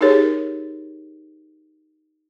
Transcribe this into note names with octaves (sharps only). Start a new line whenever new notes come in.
D#4 G4 G#4 A#4 C#5